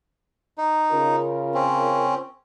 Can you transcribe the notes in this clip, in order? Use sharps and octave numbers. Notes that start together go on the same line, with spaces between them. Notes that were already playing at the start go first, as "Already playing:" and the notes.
D#4
C#3 F4 A#4
C4 C#4